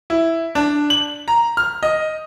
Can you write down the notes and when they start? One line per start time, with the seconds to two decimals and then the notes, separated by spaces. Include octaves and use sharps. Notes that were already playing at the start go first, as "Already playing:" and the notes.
0.10 E4
0.55 D4
0.90 F#7
1.28 A#5
1.57 F6
1.83 D#5